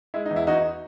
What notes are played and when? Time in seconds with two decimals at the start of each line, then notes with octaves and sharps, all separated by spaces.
0.14 G#3 E4
0.26 D#4
0.31 E2
0.36 E4
0.47 E2 D#4 F#4